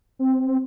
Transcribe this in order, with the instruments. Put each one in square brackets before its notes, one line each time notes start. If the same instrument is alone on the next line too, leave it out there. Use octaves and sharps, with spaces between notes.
[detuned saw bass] C4